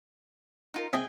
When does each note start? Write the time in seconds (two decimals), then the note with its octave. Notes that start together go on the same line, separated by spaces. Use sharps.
0.74 D#4 F4 A#4
0.93 C4 G#4 D#5 E5 G5 G#5